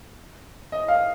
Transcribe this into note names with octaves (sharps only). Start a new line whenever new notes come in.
D#5
F5